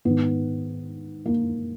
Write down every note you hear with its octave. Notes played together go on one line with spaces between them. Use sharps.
G#2 D#3 B3
A#3